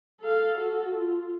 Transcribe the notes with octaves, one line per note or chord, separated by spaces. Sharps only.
A4 F5
F#4 A4
F4